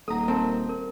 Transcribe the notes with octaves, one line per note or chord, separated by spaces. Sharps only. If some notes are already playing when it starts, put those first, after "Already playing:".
D#1 A4 F#5 A#5 D#6
C4 A#4 G5 A5
A#4